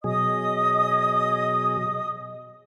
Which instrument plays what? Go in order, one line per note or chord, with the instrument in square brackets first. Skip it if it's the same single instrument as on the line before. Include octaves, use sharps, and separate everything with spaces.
[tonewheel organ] B2 F#3 G#4 [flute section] D#5 D#6